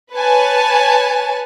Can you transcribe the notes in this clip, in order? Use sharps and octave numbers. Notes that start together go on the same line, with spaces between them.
B4 C#5 G#5 A5